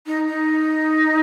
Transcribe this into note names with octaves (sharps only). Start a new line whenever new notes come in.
D#4
D#4